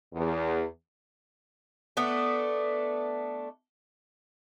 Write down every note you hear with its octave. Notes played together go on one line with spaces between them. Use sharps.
E2
A3 B3 D4